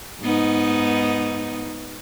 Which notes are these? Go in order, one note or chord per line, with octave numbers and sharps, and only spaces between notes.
G#2 B3 D#4